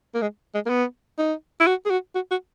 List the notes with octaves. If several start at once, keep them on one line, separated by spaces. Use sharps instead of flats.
A#3
G#3
G#3
A#3
B3
D#4
E4
F#4
G#4
F#4
F#4
F#4